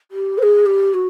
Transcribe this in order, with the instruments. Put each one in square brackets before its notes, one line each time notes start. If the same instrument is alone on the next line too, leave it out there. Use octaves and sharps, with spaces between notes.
[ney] G4
C5
G#4
G4
F#4